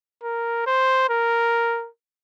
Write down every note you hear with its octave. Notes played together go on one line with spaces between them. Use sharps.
A#4
C5
A#4